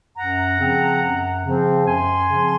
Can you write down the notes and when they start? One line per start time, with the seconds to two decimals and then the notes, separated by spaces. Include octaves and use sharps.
0.17 F#2 F#5 A#5
0.59 C#3 F3 C4
1.02 F#2
1.44 C#3 F3 C4
1.86 F#2 G#5 C6
2.29 C#3 F3 C4